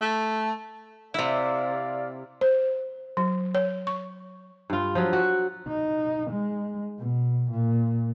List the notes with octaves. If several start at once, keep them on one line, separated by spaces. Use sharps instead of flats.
A3
C3 E4 D5 F5
C5
F#3
C#5
C#6
G2 F4
F3 F#3
F#4
D#4
G#3
B2
A#2